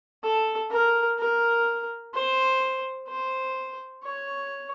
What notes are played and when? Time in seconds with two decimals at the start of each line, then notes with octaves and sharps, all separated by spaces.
0.23 A4
0.71 A#4
1.18 A#4
2.14 C5
3.08 C5
4.03 C#5